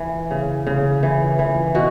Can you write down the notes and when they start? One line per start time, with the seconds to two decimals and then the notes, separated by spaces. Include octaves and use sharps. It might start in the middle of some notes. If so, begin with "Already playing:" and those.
Already playing: E3
0.31 C#3
0.67 C#3
1.03 E3
1.39 E3
1.75 B2 F#4